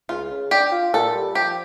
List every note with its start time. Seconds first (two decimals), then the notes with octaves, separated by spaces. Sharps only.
0.09 C#2 F4
0.30 C#3
0.51 D4 G4
0.72 F4
0.94 A#2 A4
1.14 G3
1.35 F3 G4